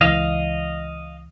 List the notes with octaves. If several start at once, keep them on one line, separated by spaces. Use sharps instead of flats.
C#2 E3 D#5 F5